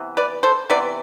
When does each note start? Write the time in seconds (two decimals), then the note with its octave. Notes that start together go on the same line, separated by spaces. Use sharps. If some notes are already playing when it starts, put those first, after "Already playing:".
Already playing: C3 E3 B3
0.17 B4 D5
0.43 A4 C5
0.70 C3 E3 B3 B4 D5